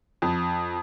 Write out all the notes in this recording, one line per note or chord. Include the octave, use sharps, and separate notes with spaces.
F2